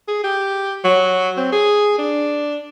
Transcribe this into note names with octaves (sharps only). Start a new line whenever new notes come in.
G#4
G4
F#3
C4
G#4
D4